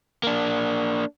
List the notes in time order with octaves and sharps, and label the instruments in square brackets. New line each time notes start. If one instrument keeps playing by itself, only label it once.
[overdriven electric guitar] A#3 D4